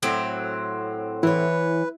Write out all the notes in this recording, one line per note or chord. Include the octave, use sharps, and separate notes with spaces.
A2 F#3 C4
E3 E4 B4 C#5